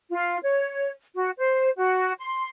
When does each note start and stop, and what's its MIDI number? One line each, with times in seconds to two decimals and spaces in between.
0.11 0.37 65
0.43 0.90 73
1.15 1.30 66
1.38 1.70 72
1.76 2.13 66
2.19 2.49 84